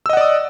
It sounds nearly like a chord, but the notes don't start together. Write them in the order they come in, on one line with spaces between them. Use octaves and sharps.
E6 D#5 F#5 D5 D#6